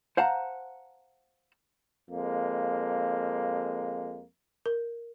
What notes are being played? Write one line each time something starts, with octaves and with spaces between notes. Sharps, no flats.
C5 F5 F#5 A5 A#5
F2 G#3 A#3
A#4